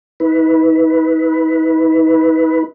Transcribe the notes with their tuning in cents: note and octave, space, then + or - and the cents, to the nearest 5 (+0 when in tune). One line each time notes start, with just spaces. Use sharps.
D#4 +45 B4 +0